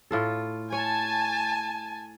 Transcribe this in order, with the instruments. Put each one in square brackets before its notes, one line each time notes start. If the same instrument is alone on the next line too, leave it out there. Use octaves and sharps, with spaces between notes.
[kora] A2 F4 A4
[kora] C#5 [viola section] G#5 A5